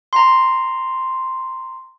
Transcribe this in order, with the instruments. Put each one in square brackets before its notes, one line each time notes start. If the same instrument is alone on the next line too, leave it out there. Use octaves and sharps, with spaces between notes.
[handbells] A#5 C6